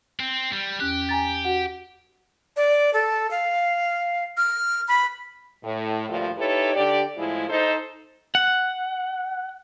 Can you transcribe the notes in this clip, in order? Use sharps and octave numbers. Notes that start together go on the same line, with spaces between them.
C4
G3
E2 C#4 G4 F#6
G#5 A#5 A6
F#4 F#5
D5
A4
F5
F6
B5
A2
D2 G2 A#2 F3 A3 F4
D#4 E4 G4 A4 B4 C#5
D3 G4 D5
A2 F3 G#3 E4
D#4 A4 C5
F#5